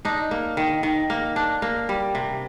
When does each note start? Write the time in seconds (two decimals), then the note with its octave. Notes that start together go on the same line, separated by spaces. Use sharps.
0.05 D4 D#4
0.31 A#3
0.57 D#3
0.83 D#3
1.10 A#3
1.36 D4
1.62 A#3
1.89 G3
2.15 C3